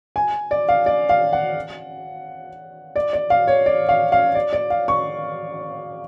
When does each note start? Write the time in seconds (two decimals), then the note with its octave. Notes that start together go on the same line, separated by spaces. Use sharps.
0.16 G#5
0.51 D5
0.69 F5
0.86 D5
1.09 F5
1.33 F#5
2.96 D5
3.13 D5
3.30 F5
3.47 C#5
3.66 D5
3.89 F5
4.12 F5
4.35 D5
4.53 D5
4.70 F5
4.88 C#6